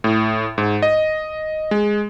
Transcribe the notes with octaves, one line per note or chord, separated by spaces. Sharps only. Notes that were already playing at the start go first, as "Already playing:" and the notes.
A2
G#2
D#5
G#3